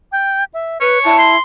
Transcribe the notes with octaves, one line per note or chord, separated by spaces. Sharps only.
G5
E5
B4 C#5
E4 A5
C6